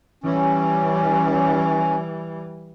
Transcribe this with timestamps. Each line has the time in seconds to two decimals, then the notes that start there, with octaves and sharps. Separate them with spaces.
0.24 E3 G3 C#4